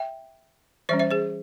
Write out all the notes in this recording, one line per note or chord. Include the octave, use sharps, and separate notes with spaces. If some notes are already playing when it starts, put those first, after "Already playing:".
Already playing: E5 G5
E3 G3 C#4 C5 E5
C5 E5
G#4 C5